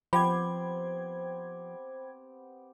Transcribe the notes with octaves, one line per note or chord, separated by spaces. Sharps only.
F3 B3 C4 G4 C5 G5 B5 G#6